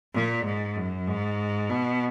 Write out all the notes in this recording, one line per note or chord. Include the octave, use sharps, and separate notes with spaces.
A#2
G#2
F#2
G#2
B2